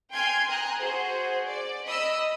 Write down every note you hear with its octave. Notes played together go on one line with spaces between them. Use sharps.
G5 G#5 C6 F6 G6 G#6
G#5 A#5 D#6 F#6
F#4 G#4 C5
D5
D#5 B5 D#6 E6